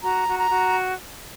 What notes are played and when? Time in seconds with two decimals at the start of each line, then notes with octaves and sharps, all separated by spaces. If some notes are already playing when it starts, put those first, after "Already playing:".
0.02 F#4 A#5
0.26 F#4
0.37 A#5
0.50 F#4